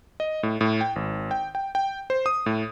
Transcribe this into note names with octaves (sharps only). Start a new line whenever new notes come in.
D#5
A2
A2
G5
G#1
G5
G5
G5
C5
D#6
A2